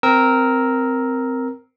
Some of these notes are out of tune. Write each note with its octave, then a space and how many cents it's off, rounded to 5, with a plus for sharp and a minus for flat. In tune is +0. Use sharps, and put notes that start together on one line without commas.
C4 -10 A#4 +0 E6 -20